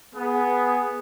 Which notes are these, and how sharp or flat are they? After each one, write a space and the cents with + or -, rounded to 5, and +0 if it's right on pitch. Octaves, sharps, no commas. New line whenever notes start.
B3 +0 G#4 +0